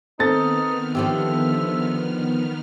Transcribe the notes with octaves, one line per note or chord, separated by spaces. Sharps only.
D#3 B3 C4 D#4 A4 F6 A6
D3 F3 G4 E5